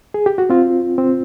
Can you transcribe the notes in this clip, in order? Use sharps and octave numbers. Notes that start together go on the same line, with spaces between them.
G#4
G4
F#4
C4 F4
C4